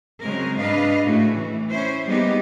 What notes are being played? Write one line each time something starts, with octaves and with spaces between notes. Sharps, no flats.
C#3 F#3 G#3 C4 A#4
G#2 D4 B4 D#5 F5
A2 C#3 A3 F#4
E3
C#4 E4 C5
G3 G#3 A#3 B3 D#4 G4